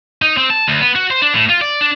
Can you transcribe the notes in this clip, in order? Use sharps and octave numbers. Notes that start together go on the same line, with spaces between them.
D#4
C4
A5
D2
B3
F#4
C5
D4
A2
F4
D5
D4